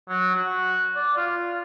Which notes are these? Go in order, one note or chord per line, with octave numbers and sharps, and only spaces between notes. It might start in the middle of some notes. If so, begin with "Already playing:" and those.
F#3
F#4
D5
F4